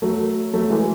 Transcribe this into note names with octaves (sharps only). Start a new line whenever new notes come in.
F#3 A3
F#3 A3
E3 G#3